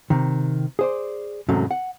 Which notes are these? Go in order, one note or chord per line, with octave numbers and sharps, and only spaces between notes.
C3 D#3
G#4 C5 D5
E2 G#2 C3 F#3 A3 C#4
F#5